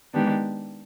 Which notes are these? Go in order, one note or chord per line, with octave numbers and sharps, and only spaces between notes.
D#3 G#3 B3 D4 G4